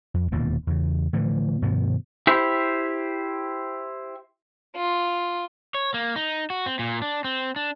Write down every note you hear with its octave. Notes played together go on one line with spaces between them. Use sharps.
F2
E1 D#2 A#2 A#3
E2 C#3
A2 D3 E3 F3
G2 B2 D#3 F3
E4 G4 C5
F4
C#5
A#3
D#4
F#4
C4
A#2
D4
C4
D4